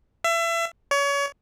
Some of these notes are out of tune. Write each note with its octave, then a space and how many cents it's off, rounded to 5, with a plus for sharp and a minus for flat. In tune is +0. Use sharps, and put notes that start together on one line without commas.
E5 +30
C#5 +30